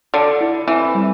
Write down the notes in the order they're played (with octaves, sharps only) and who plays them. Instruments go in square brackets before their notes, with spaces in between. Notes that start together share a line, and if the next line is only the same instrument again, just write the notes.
[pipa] D3 [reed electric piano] A4
[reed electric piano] E4
[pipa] E3 [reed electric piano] C4
[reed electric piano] G3